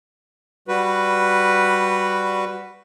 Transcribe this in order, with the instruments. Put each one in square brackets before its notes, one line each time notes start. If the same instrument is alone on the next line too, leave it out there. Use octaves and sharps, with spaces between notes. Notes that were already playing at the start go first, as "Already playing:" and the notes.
[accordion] G3 F#4 B4